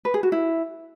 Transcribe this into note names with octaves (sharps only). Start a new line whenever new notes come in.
B4
G#4
F#4
E4